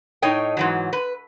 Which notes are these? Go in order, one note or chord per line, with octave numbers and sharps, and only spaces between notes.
A2 D#4 C#5 D#5 G5
G#2 E3 F#3
B4